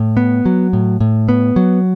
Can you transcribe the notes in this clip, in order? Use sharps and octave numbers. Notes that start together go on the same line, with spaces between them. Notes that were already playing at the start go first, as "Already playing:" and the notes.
Already playing: A2
B3
F#3
A2
A2
B3
F#3